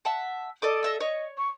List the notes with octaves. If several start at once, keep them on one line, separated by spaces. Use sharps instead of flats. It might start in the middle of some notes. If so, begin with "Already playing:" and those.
E5 F#5 A5
A4 D5 D#5 D6
D#5 E5 E6
C#5 D#5 C#6
C#6